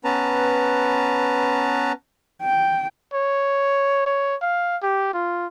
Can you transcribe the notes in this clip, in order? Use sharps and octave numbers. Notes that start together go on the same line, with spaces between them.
B3 C#4 B4 A5 A#5
G5
C#5
C#5
F5
G4
F4